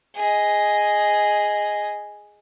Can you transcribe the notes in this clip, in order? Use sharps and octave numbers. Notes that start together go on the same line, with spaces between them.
G#4 D#5